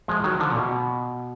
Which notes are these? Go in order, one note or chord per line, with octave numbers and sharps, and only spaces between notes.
F3 G#3
D#3 F#3
D3 F3
A#2
B2